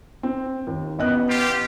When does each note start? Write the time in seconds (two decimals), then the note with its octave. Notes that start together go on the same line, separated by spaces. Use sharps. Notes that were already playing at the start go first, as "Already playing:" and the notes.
0.23 C4
0.67 D#2
0.99 A1 B3 D#5 F#6
1.29 F4 G4